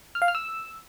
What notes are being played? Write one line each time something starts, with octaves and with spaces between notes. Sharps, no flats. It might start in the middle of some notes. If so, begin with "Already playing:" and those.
F6
F5
F6
E6